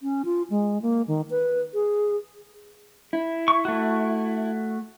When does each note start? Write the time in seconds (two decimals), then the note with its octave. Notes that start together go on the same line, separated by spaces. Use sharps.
0.01 C#4
0.25 F4
0.50 G#3
0.82 A#3
1.07 D#3
1.30 B4
1.74 G#4
3.13 E4
3.48 C#6
3.65 A3 F#4